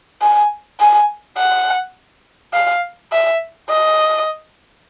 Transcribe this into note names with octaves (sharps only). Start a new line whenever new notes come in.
G#5
G#5
F#5
F5
E5
D#5